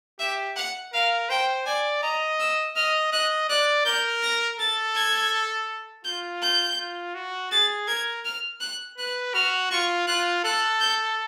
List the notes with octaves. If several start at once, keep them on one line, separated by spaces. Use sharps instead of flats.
G4 E5
F#5
A#4 F5
C5 G5
D5 G#5
D#5 A#5
E6
D#5 F6
D#5 F#6
D5 F#6
A#4 G6
A#6
A4 A6
G#6
F4 G6
G6
F4
F#4
G#4 A6
A#4 G#6
F6
F#6
B4 F#6
F#4 F6
F4 C#6
F4 F#6
A4 F#6
G6